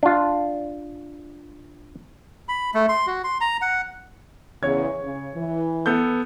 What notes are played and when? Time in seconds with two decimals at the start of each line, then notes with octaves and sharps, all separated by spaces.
0.03 D4 F4
2.48 B5
2.74 A3
2.89 C6
3.07 F#4
3.24 C6
3.41 A#5
3.62 F#5
4.63 E2 C#3 C#5 G#6
5.02 C#3
5.35 E3
5.86 B3 A4 G6